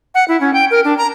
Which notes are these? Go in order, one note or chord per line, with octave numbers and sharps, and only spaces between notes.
F#5
E4
C#4
G5
A#4
D4
A#5